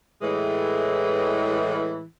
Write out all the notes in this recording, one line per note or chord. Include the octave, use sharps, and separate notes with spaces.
A2 E3 G#3